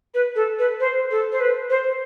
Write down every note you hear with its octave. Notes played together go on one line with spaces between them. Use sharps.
B4
A4
B4
C5
A4
C5
B4
C5